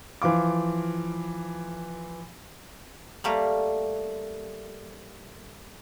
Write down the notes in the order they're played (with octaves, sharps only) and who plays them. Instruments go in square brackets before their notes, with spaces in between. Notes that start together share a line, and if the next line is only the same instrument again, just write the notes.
[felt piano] E3 F3 F5 D6
[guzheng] G3 A3 A#3 F5